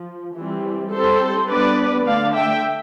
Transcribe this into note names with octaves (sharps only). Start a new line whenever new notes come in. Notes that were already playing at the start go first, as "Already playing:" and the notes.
Already playing: F3
E3 G3 C4
G3 C4 E4 A4 C5
G3 B3 D4 B4 D5
D3 A3 D4 D5 F5
E5 G5